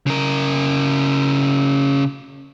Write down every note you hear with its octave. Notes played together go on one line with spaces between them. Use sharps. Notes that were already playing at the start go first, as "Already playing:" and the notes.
C#3 A#4